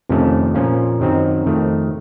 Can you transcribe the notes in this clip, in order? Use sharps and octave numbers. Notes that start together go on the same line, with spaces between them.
F2 C3 D#3 A3 C#4
A#2 F3 A#3 C#4 F4
F#2 D#3 F#3 C4 D#4
F2 D#3 A3 C4